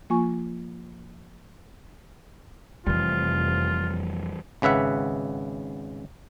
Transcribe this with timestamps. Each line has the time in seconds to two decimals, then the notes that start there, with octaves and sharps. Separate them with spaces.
0.10 F3 A#3 F4 G#5 C#6
2.87 F1 F2 C3 E3 G3 F4
4.62 G#1 C#3 B4 E5 F#5